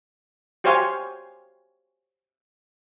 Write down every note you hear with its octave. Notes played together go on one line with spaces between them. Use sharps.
F#4 G4 C5 C#5 F5 G#5